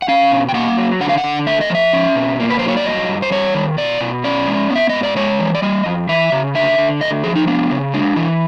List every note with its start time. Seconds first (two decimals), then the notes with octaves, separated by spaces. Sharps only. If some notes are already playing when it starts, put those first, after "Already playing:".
0.02 F#5
0.08 C#4 F5
0.32 B2
0.49 G5
0.54 A#3 F#5
0.78 F#3
1.01 D3 F#5
1.09 F5
1.18 F#5
1.24 D3
1.47 A3 E5
1.61 D#5
1.70 F3 E5
1.93 C#4
2.16 B2
2.40 A#3
2.50 B4
2.59 F#3 C5
2.68 C#5
2.77 D5
2.85 G2 D#5
3.09 G2
3.22 C5
3.32 G3 C#5
3.54 D#3
3.78 B2 D5
4.01 B2
4.24 C#4 D5
4.47 G#3
4.70 B3 E5
4.89 G#2 D#5
5.03 D5
5.16 G#3 C#5
5.39 E3
5.55 D5
5.62 G3 D#5
5.86 F2
6.09 E3 E5
6.32 C#3
6.55 D3 E5
6.78 D3
7.01 A3 D#5
7.24 F3 G#4
7.35 D#4
7.47 B3 D4
7.71 C#3
7.93 G#3 D4
8.16 E3